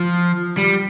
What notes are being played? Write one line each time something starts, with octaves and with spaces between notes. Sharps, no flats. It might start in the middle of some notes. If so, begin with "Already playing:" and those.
Already playing: F3
G3